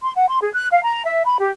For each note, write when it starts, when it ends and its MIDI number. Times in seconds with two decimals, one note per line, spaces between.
0.02 0.12 84
0.15 0.27 78
0.29 0.38 84
0.43 0.50 68
0.54 0.67 90
0.72 0.83 77
0.83 1.03 82
1.05 1.24 76
1.25 1.36 83
1.40 1.48 67